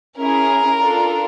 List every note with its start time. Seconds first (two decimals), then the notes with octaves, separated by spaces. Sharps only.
0.19 C#4 E4 G#4 A#4
0.79 D4 F4 A4